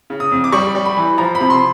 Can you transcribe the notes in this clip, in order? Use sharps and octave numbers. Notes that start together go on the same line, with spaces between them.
C#3
D#6
F2
D6
G3 C#6
G3
B5
E3
F3 A#5
B5
C3
C6